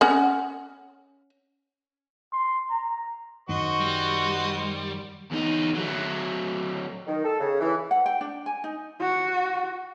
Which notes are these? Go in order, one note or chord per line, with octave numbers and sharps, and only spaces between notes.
C#4 F#5
C6
A#5
F#2 D#3 F#4 C5 D#5 C#6
G3
E2 D#4
F#3 A3
D#3
A4
C#3
E3
F#5
G5
D4
G#5
D#4
F#4